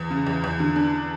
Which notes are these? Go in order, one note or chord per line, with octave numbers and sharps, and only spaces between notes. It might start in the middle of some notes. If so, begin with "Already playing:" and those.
Already playing: E2
C#3
E2
E2
D3
D4